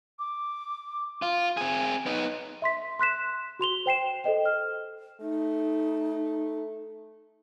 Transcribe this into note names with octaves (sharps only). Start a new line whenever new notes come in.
D6
F4
C4 G#4
B3 D#4
E5 C6 B6
C6 F#6 B6 E7
F#4 C6 F7 G7
C5 G5 C7 E7
A4 C5 D#5 G5
F6
A3 D#4